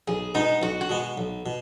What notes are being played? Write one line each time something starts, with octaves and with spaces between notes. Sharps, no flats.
B1 G#4
B2 G#3 B3 D#4
B1 F#4
F#4
B2 G#3 B3
B1
B2